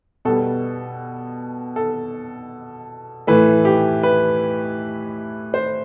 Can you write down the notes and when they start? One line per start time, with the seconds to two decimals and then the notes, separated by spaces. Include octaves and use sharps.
0.25 B2 G3 B3 A4
1.76 A4
3.27 A2 E3 A3 B4
3.65 G4
4.03 B4
5.54 C5